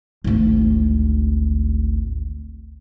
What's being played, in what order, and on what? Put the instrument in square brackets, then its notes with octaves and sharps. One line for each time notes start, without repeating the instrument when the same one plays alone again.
[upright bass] G#1 D2